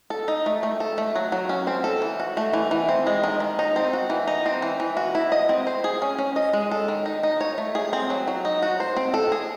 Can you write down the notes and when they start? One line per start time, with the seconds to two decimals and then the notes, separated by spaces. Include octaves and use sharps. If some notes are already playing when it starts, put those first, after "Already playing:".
0.10 A4
0.28 D#4
0.46 A3
0.63 A3
0.80 A4
0.98 A3
1.15 F#3
1.32 F#3
1.49 C#4
1.67 C4
1.84 A4
2.02 E3
2.20 F#4
2.37 A3
2.53 E3
2.71 E3
2.89 C4
3.07 G#3
3.24 D#3
3.40 D#3
3.59 D#4
3.76 C4
3.93 F#4
4.10 E3
4.27 D#4
4.46 C4
4.62 E3
4.80 E3
4.97 F#4
5.15 E4
5.32 D#5
5.49 C4
5.67 C5
5.84 G#4
6.02 C#4
6.18 C#4
6.36 D#5
6.53 G#3
6.71 A4
6.88 D#3
7.06 D#4
7.23 D#4
7.41 C#5
7.58 A3
7.75 G#4
7.93 C4
8.10 F#3
8.28 F#3
8.45 D#4
8.62 F#4
8.80 C5
8.97 C4
9.14 A4
9.32 G#4